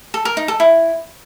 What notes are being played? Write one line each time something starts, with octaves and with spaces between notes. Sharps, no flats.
A4
A#4
D#4
A4
E4